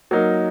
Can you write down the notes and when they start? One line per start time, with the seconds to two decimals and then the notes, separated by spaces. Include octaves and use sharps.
0.11 F#3 A#3 D#4 A#4